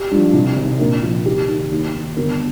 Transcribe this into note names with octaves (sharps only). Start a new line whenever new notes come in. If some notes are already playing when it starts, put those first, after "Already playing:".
Already playing: G4
G2 F3
C2
C3 D#3
A#1 A#4
A#2 F3
D#2 G4
D#3
D#2
D#3
G1 A#4